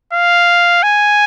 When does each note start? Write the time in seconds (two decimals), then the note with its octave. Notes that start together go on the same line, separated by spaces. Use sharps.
0.13 F5
0.83 G#5